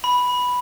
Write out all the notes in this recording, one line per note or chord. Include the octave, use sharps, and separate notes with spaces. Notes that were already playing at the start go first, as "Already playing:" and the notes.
B5